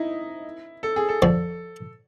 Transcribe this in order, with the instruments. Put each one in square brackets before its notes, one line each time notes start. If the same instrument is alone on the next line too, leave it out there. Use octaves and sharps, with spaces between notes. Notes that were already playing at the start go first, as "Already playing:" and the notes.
Already playing: [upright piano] D#4 E4
A4
G#4
A4
[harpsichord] F2 D3 F3